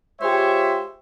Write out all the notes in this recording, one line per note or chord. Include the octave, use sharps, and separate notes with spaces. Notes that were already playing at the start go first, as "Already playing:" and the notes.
G#3 F4 G4 C5 C#5 E5